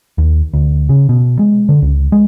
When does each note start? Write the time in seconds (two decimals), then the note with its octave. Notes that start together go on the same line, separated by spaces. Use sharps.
0.18 D#2
0.53 D2
0.89 C#3
1.09 B2
1.39 G#3
1.69 D3
1.82 C#2
2.12 G#3